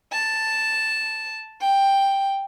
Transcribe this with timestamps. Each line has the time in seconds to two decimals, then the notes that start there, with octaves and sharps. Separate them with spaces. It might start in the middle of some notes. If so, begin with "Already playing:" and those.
0.13 A5
1.61 G5